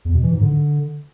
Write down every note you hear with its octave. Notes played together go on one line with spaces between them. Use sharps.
E2
B2
E3
G#2
D3